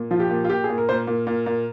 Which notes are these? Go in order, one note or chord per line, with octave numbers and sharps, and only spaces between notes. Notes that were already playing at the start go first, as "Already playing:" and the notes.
Already playing: A#2
F3 F4
G4
A#2
F4
A#2 G4
A#2 G#4
A#4
A#2 A#4 C5
A#2
A#2
A#2